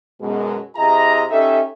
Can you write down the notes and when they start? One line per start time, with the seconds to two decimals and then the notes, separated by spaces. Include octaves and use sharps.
0.21 F#2 B2 G#3
0.76 C3 E4 G#4 D#5 E5 A#5
1.31 C#4 D#4 G4 A4 D#5 E5